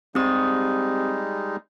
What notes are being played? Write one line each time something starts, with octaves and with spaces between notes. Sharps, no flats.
G3 G#3 C4 D#4 G4 D#6